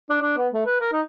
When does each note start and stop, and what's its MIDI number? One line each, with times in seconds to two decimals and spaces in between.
0.10 0.17 62
0.22 0.36 62
0.37 0.48 59
0.54 0.63 57
0.66 0.80 71
0.81 0.89 70
0.92 1.01 63